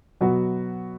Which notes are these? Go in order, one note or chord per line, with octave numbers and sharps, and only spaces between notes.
B2 F#3 B3 F#4